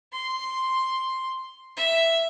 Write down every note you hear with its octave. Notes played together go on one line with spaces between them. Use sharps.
C6
E5